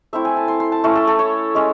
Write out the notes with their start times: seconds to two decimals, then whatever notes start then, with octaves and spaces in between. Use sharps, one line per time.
0.13 A3 C4 E4 E5
0.25 G#5
0.37 A5
0.48 C6
0.60 C6
0.72 A5
0.84 A3 C#4 E4 C#5
0.96 A4
1.07 A4
1.19 C#5
1.55 G#3 C#4